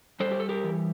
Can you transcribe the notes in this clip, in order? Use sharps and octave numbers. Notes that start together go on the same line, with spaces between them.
G3 A4 C5
G4
A4
G4 A#4
E3